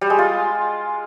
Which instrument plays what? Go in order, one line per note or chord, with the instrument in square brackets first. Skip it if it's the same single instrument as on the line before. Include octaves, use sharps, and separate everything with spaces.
[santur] G3
G#3
F4